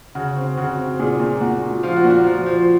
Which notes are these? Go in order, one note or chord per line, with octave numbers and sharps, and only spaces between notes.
C#3 F#4
C4
C#3 F#4
C4
A#2 G#4
A#2
A#2 F#4
A#2
F3 F4
F#4
A#2
F#4
F3
F3